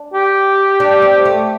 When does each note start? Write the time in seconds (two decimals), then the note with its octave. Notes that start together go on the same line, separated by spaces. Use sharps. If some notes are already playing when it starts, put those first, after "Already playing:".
Already playing: D4
0.14 G4
0.80 D4
1.02 C4
1.25 A3